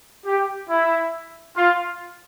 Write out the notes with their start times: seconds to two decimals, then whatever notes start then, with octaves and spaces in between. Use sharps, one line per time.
0.25 G4
0.68 E4
1.56 F4